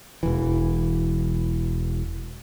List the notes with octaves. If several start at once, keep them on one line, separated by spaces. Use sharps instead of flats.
E1 E3